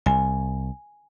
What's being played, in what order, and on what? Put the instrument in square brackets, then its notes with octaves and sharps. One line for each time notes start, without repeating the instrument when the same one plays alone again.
[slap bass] C2 [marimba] G#5